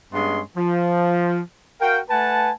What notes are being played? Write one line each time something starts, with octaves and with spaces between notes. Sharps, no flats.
G2 G#3 B3 C#4 D#5 C6
F3
F#4 A#4 F5 G5
A3 B4 F#5 G#5 A5